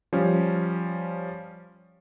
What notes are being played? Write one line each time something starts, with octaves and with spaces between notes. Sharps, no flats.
F3 G3 C#4